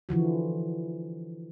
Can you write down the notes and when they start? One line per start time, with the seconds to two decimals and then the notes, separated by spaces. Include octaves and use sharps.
0.09 D3 E3 F3 F#4